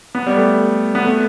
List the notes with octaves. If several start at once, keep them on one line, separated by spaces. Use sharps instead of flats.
B3
G3
A3
B3
A3